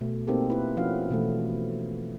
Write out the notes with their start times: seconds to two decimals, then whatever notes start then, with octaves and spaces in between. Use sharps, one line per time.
0.01 B2 A3
0.27 A#3 C4 D#4 G4 A4
0.50 E4 B4
0.77 F3 C#4 E4 F#4 B4 F5
1.11 B2 E3 A3